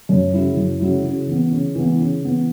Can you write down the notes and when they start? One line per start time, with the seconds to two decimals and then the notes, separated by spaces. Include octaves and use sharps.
0.09 F#2
0.33 C#3 F#3 E4
0.57 F#2
0.80 C#3 F#3 E4
1.04 C#3
1.27 E3 B3
1.52 C#3
1.75 E3 B3
1.99 C#3
2.23 E3 B3